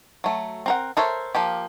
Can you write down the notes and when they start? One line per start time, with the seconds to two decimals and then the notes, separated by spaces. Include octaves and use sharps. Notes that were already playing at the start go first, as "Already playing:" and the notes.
0.24 F#3 A3
0.66 C4 A#4 F#5
0.97 A4 A#4 C5 C#5 E5
1.35 F3 A#3 G4